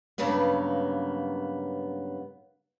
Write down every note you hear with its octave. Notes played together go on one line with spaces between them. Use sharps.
G2 C#3 F#3 A#3 B3